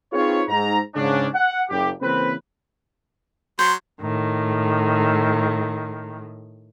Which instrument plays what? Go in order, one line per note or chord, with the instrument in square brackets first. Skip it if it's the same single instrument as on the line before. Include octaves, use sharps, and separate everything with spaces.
[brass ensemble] C4 D#4 F4 G#4 B4 C#5
G#2 A#5
G#2 C#3 C#4 D4
F#5
F#1 G4
C#3 E3 A#3 C4 B4
[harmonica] F#3 C6 [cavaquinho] C5
[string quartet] A2 D#3